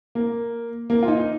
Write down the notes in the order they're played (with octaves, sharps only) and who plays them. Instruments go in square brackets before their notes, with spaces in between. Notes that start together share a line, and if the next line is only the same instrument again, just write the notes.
[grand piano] A#3
A#3
F4
D#4
D#4